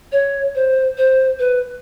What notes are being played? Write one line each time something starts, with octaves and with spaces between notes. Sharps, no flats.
C#5
C5
C5
B4